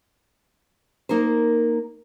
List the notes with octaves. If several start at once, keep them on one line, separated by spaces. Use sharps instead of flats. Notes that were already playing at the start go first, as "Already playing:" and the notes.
A#3 D#4 A#4 C5